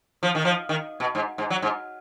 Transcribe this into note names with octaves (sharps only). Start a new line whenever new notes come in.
F3
D#3
F3
D#3
B2
G#2
G#2
F#3
G#2